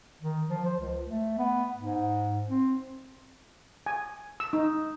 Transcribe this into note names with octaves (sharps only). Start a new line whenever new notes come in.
D#3
F3
C5
C#2
A3
B3
G#2
C4
G#5
E6
D#4